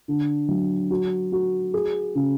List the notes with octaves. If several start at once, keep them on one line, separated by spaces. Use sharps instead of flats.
D3
F#3
F#4
F#4
G#4
C#3